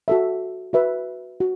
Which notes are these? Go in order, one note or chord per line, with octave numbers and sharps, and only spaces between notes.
F#4 A4 E5
F#4 B4 E5
F#4